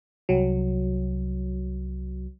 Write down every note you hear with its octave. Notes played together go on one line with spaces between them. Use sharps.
C2 F#3